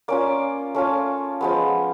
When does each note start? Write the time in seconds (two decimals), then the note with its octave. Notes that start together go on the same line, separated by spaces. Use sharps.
0.08 A#3 C#4 F4 D5
0.75 A3 C#4 F4
1.41 F3 G#3 B3